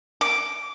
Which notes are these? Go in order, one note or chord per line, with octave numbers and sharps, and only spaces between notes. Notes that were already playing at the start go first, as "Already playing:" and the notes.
D6